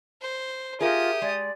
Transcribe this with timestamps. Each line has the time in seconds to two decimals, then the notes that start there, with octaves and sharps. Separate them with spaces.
0.22 C5
0.81 F4 G4 G#4 A#4 E5 D#6
1.22 G#3 D5